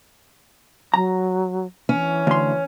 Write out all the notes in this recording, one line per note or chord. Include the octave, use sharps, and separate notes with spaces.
F#3 A#5
E3 C#4
D2 C6